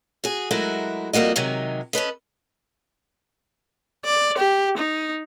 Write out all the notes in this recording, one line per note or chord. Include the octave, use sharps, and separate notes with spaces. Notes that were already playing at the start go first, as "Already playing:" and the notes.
F#4 G#4
F#3 G#3 A3 E4 F#4 A#4
F2 G3 A#3 F#4 D#5
C3 D#3 F#3 G#3 D#4
C#4 A4 B4 D#5
D5
G4
D#4